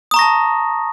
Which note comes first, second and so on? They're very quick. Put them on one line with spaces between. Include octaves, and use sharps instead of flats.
D#6 A#5 C#6 A#6 A5